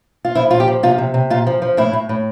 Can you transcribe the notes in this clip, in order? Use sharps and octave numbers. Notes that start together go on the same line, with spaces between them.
F4
F3 E4
A#2 F4
G4
F3
C3 F4
C3
C3
A#2 F4
F3
F3
A2 E4
A2
A2